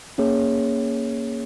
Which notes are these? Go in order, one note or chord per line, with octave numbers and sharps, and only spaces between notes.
A#3 C#4 G#4 C#5